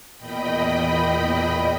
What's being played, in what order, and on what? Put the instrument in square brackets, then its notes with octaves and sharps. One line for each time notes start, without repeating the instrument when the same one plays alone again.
[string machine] E2 A#2 D#5 G5 B5